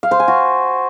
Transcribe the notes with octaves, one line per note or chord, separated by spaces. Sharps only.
F5
C5
G#5
F#4